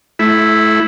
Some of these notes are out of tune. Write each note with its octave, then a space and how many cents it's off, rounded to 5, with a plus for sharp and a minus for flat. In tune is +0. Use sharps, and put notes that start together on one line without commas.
A3 -30 E4 +0